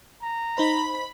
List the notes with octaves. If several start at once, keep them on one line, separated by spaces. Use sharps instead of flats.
A#5
D#4 C5 B5